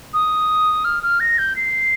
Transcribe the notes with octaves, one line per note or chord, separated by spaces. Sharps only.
D#6
F6
F6
A#6
G6
C7